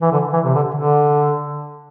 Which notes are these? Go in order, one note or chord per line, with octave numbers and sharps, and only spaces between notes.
E3
D3
E3
C3
D3
D3